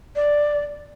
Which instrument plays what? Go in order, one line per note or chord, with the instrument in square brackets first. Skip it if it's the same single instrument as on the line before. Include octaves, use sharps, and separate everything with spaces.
[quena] D5